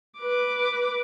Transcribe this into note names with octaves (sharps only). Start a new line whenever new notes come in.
B4 D6